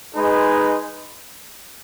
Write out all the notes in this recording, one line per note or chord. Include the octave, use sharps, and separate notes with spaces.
G#3 D#4 G#4 B4